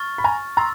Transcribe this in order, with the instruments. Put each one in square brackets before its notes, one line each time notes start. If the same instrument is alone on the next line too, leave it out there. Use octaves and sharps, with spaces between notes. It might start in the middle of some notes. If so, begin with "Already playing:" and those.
Already playing: [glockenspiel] C#6 F6 A6
[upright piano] B5
G#5 A#5
[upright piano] A#5 C6 [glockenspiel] E6 A6